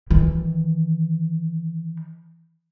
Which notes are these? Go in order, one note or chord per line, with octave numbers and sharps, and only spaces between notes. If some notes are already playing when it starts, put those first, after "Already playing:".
D#3 E3